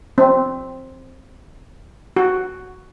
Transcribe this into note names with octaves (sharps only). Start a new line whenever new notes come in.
C4
F#4